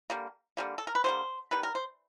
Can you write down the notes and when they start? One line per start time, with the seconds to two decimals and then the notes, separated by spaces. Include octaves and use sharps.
0.10 D3 G3 A#3
0.57 D3 G3 A#3
0.78 A4
0.87 A#4
0.95 B4
1.04 D3 G3 A#3 C5
1.51 D#3 G3 B3 B4
1.63 A#4
1.75 C5